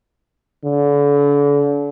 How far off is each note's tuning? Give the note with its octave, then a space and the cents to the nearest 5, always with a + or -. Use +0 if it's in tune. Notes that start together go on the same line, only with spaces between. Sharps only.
D3 -40